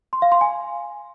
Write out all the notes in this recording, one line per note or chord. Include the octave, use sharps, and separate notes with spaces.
C6
F5
C6
G#5